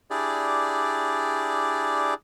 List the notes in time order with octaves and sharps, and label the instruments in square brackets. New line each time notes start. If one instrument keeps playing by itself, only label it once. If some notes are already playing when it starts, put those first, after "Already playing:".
[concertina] D4 E4 G4 G#4 D5